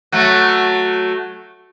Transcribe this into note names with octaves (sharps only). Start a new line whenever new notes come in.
F#3 A3